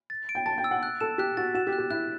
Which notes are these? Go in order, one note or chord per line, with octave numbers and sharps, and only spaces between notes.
A6
D7
G5
A5 A6
G5
E6
F#5
F#6
A4 E7
G4 F#6
F#4 A6
F#4 E7
G4
F#6
G4
E4 F#6